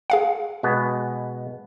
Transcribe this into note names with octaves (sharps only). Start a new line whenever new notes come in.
G#4 F5 F#5
B2 G#3 B3